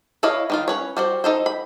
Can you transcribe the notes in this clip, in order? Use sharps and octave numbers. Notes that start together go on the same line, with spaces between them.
E4 B4 C#5 D#5 F5
D#3 D#4 F4
C#4 B4 C#5
G3 F#4 C5
D#4 A4 C5
B5